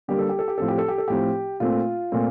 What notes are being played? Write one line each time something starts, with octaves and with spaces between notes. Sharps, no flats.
D3 G3 A#3 G4
A4
G4
A4
G4
A2 F3 C4 A4
G4
A4
G4
A4
A2 F3 C4 G4
A#2 A3 C4 F4
A#2 A3 C4